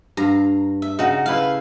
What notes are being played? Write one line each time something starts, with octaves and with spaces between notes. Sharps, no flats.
G2 F5 A#5
E5
C#3 D#4 F#4
A3 E4 B4 F5